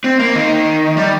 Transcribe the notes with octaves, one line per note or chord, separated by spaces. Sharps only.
C4
A#3
D#3
G3